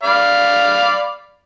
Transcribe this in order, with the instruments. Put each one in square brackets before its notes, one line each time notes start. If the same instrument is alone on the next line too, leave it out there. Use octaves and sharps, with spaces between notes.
[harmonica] D5 F5 B5